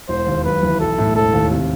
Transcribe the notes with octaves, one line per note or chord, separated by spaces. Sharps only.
E1 C5
D#2
F#2 B4
E3
B1 A4
A2
E1 A4
D#2
C3